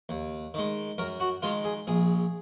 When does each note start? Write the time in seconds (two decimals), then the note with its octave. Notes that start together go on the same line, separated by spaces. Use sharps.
0.09 D#2
0.54 D#3 G#3
0.98 F#2 A#4
1.20 F#4
1.42 D#3 G#3 F4
1.64 G#4
1.87 A#1 G#4